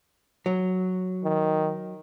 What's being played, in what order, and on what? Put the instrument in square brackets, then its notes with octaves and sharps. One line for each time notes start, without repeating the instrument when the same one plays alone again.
[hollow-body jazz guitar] F#3
[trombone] D#3